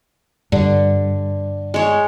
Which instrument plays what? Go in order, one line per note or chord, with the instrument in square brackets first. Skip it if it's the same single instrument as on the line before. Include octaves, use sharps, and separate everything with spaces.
[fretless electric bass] G2 [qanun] D3
[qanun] G#3 C#5